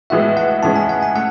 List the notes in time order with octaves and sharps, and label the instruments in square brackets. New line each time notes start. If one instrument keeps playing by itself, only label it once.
[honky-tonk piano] A2 E3 G#3 B3 F#4 [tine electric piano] E5
[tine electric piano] F#5
[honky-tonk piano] A2 E3 G#3 C#4 [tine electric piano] A5
[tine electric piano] G#5
F#5
G#5
[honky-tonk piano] A3 [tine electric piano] F#5